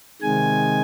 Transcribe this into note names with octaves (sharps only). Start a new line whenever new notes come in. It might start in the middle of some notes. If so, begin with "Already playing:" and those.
C3 D#3 G#3 G#5